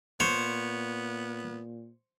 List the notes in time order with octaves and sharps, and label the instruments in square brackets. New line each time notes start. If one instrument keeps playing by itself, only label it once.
[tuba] A#2 [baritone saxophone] B3 [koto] C5 [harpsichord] C#5